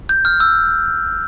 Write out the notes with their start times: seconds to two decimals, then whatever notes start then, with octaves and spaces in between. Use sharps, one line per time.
0.09 G6
0.25 F6
0.40 E6